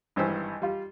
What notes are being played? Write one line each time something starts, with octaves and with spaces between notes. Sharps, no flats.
G#1 G2 E3 C5 E6
G3 F4